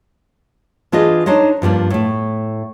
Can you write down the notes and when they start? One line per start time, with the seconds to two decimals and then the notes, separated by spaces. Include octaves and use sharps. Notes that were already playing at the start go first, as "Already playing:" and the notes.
0.92 E3 D4 F4 G#4 D#5
1.26 D4 D#4 C5 C#5 D#5
1.62 G2 F3 A#3 D4
1.90 A2 A3